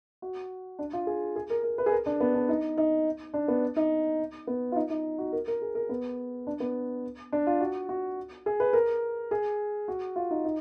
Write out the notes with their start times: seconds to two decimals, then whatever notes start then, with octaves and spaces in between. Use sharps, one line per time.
0.22 F#4
0.79 D4
0.93 F4
1.07 G#4
1.36 G#4
1.50 A#4
1.63 A#4
1.78 B4
1.86 G#4
1.92 A#4
2.06 D4
2.21 B3
2.35 D4
2.49 D#4
2.78 D#4
3.34 D4
3.48 B3
3.76 D#4
4.47 B3
4.72 F4
4.76 D#4
4.90 D#4
5.18 F#4
5.32 A#4
5.48 A#4
5.62 G#4
5.75 A#4
5.89 B3
6.47 D4
6.60 B3
7.32 D4
7.47 F4
7.61 F#4
7.89 F#4
8.46 G#4
8.60 B4
8.73 A#4
9.31 G#4
9.88 F#4
10.16 F4
10.31 D#4
10.45 D#4